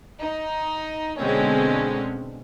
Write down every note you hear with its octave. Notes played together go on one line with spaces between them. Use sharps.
D#4
B2 D3 G#3 C4 C#4